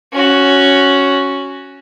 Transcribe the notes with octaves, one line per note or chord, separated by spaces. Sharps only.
C#4 F#4